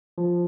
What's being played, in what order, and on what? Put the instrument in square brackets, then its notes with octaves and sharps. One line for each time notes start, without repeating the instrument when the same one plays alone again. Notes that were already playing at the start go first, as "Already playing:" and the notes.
[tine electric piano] F3